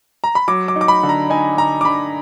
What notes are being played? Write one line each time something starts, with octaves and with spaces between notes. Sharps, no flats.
A#5
B5
F#3 D6
D6
D#4
D6
B5
D3
A#5
D#4 G#5
D3 A#5
D6
D3 B5